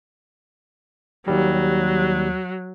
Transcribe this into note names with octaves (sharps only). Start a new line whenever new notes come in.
D#2 F#3 G3